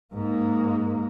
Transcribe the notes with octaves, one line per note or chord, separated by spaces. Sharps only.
G#2 A#3